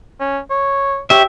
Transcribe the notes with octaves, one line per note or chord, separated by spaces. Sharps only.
C#4
C#5
G4 C#5 E5